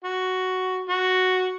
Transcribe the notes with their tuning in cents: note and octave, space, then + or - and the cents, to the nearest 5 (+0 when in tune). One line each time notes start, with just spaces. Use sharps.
F#4 +5
F#4 +0